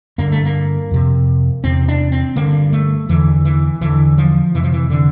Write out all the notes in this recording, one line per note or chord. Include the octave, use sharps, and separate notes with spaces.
G2 D3 A#3
A3
A#3
F2 C3
E2 C3 C4
D4
C4
G2 D3 A#3
A3
E2 D3 E3
E3
E2 D3 E3
F3
F2 C3 E3
F3
E3
D3